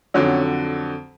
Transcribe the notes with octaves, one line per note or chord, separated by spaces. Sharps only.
F2 D3 F#3 C#4